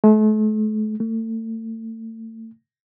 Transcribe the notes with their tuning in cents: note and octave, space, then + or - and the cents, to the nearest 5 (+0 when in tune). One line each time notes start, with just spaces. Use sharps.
A3 -40
A3 +35